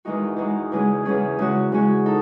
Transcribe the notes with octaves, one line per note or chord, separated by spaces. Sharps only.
E2 D#3 G#3 D#4 F#4
E2 D#3 G#3 D#4 F#4
E2 C#3 G#3 C#4 G#4
E2 C#3 G#3 C#4 G#4
C#3 G#3 C#4 F#4
C#3 G#3 C#4 F#4
D#4 A4